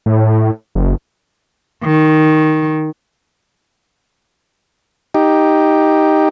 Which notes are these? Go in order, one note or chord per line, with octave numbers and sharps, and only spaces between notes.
A2
F#1
D#3
D#4 G4